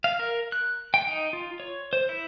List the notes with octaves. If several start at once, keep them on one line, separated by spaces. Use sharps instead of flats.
F5
A#4
F#6
G5
D#4
F4
C#5
C5
E4